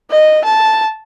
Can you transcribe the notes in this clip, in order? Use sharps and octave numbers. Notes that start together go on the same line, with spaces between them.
D#5
A5